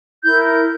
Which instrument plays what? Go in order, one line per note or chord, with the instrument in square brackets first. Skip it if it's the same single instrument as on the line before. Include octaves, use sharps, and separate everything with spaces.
[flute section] E4 A#4 G6